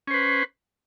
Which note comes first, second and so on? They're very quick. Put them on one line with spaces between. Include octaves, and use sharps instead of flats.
C#4 C5 B4